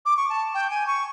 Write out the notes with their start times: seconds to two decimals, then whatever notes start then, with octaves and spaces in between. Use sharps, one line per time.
0.06 D6
0.17 C#6
0.29 A5
0.54 G5
0.70 G#5
0.87 C#6